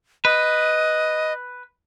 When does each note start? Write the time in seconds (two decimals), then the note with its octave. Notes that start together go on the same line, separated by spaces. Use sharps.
0.25 B4 D#5